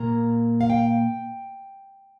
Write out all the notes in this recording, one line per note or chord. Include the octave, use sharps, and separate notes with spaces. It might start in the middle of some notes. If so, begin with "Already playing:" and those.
Already playing: A#2 A#3 A#5
F5
G5